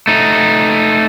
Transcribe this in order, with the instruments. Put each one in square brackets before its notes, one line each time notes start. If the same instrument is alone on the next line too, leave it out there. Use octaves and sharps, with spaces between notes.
[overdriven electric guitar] A3 D#4